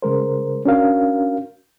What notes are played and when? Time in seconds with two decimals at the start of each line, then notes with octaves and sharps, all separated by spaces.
0.02 C#3 G#3 A#4 C5
0.65 C#4 D4 F#4 A#4 F5